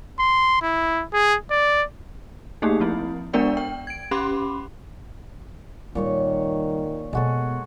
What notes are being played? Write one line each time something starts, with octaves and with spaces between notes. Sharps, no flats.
C6
E4
G#4
D5
A3 A#3 D#4 G4 G#4
F3 C4 E4
G#3 B3 D4 A#4 D5 F#5
G5
G#6 D7
C#4 G4 B5 C6 D6
A#2 D#3 G3 C#5 C#6
B2 G#3 B3 F#4 A4